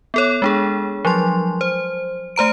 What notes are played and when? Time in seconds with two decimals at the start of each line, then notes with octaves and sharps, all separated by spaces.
0.14 B3 A4 C#5
0.42 G#3 D4 G#4
1.05 F3 F#3 C6
1.61 C5
2.36 A3 C5 A#5 D7